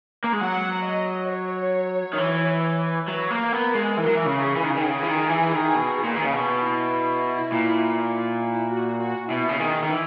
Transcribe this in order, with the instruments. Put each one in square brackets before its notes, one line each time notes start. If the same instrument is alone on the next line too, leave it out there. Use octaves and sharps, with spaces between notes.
[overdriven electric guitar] A#3
G#3
[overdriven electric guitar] F#3 [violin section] F#5
[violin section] D#5
C#5
[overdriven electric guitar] D#3
E3
[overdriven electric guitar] F#3 [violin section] B4
[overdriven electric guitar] A#3
[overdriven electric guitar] B3 [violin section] A#4
[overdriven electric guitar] G#3
[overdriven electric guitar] E3 [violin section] A#4
[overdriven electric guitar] F#3
E3
C#3
[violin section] G#4
[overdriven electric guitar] E3
D#3
C#3
D#3
C#3
E3
D#3
E3
D#3
B2
A#2
D#3
C#3
B2
[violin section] E4
[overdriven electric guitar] A#2
[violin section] E4
F#4
F#4
[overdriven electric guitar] B2 [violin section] E4
[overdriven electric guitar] C#3
[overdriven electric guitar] D#3 [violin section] G#4
[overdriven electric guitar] D#3
E3